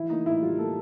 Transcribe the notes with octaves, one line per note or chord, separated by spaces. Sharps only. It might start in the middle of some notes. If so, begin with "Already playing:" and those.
Already playing: E3 E4
A#3 D#4
A2 E4
G3 F4
A#3 A4